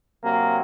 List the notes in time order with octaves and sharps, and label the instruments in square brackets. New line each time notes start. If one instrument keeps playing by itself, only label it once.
[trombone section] C3 F#3 A#3